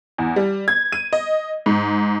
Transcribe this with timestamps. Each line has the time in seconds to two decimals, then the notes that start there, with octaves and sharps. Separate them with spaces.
0.18 E2
0.36 G3
0.68 G#6
0.92 D#7
1.13 D#5
1.66 G#2